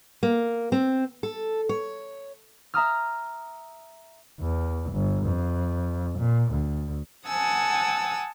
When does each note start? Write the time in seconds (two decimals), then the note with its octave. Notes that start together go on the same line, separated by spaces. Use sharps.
0.23 A#3
0.72 C4
1.23 A4
1.69 C#5
2.74 E5 A#5 D#6 F6
4.40 E2
4.92 G1
5.25 F2
6.18 A#2
6.51 D2
7.26 F#5 G#5 A5 D#6 E6